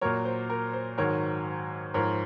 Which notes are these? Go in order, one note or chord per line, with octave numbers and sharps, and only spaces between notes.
A#2 F#3 A#4 C#5
C5
A#4
C5
G#2 D#3 F#3 A#4 C#5
G#2 F3 A#4 C#5